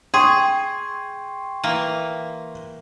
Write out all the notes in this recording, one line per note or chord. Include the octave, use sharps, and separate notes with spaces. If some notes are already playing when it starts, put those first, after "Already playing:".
G#4 G5 C6 C#6
E3 A#3